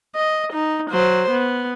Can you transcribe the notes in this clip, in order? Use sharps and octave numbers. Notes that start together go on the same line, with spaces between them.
D#5
D#4
F#3 C5
B3